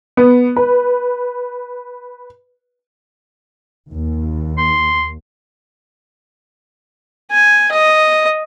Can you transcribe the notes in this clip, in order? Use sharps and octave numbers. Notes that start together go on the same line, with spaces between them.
B3
B4
D#2
C6
G#5
D#5